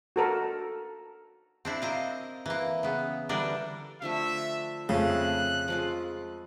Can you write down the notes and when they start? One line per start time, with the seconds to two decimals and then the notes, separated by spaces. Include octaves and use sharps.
0.16 F#4 A4 A#4
1.65 C4 D4 E4
1.82 A#4 C5 D#5 F5
2.46 E3 A#3
2.83 C#3 B3
3.29 D3 E3 G3 D4 A4 A#4
4.02 D3 F3 A3 E5
4.89 F2 C#3 A3 G#4 F5 F#6
5.68 F3 G#3 F4